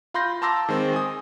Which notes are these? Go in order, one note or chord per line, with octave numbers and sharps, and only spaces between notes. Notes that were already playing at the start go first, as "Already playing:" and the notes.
F4 B5 C6 G6 A#6
A5 A#5 C6 D6 E6 A#6
D#3 G#3 C4
G#5 D#6